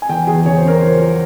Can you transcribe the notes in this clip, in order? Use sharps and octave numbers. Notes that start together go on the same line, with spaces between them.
G#5
E2 G5
E2 G#4
C#3 C#5
C5
C#3 A#4
F3 C5
F3